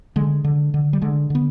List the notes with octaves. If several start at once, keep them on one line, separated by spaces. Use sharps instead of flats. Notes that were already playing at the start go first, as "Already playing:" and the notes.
D3 G#3
D3
D3
G3
D3 G#3
D3 B3